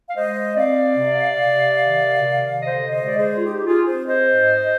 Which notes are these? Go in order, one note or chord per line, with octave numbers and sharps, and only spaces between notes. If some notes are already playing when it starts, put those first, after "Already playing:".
F5
G#3 C5 D#5
C4 D5 F5
C3
C3
D#3
C3
D3 C5 D#5
C5 D#5
G#3 D5
G#4 C5
F4
D#4 G4
F4 G#4
C4 G#4 C5
C5 D#5
G#2